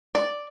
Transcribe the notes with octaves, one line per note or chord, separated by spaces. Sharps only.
D5